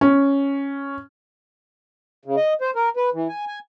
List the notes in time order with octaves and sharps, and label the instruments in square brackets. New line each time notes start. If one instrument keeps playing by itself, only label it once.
[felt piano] C#4
[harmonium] C#3
D#5
C5
A#4
B4
E3
G#5
G#5